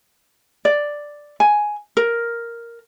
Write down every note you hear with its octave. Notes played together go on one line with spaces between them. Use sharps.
D5
G#5
A#4